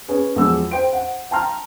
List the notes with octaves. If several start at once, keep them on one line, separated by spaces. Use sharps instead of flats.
C#4 G#4 B4
E2 F3 F#3 G#3 E6
C5 G5 C6 D7
F#5
G5 A5 A#5 C6 F6